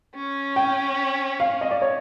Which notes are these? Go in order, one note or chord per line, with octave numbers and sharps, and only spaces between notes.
C#4
G5
F5
D#5
D5
C#5